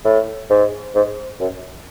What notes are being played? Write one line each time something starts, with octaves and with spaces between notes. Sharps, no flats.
A2
G#2
G#2
F#2